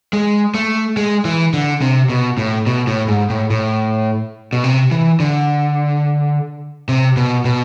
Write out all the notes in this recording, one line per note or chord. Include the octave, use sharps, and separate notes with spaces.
G#3
A3
G#3
E3
D3
C3
B2
A2
B2
A2
G#2
A2
A2
B2
C3
E3
D3
C3
B2
B2